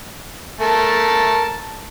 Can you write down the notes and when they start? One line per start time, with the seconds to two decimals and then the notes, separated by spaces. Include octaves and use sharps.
0.61 A3 A#4 A5